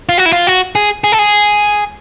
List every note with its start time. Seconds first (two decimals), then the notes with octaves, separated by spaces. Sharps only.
0.09 F4
0.18 F#4
0.26 E4
0.33 F4
0.47 F#4
0.75 G#4
1.04 G#4
1.12 A4
1.19 G#4